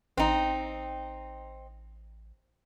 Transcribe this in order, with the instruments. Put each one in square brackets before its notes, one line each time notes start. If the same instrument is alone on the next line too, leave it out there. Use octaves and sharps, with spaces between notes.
[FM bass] A1 [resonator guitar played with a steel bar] C4 D#4